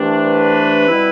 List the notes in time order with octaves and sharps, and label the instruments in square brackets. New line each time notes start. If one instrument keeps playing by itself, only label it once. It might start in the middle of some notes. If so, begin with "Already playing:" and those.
Already playing: [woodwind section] C2 C3 E3 A3 D4
[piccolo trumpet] B4
[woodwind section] B2 G3 C4 E4